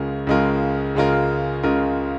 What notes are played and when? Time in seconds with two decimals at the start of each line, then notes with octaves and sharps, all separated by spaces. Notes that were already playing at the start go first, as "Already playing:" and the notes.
Already playing: C#2 C#3 G#3 F4 A#4
0.27 C#2 C#3 G#3 F4 A#4
0.95 C#2 C#3 G#3 F4 A#4
1.63 C#2 C#3 G#3 F4 A#4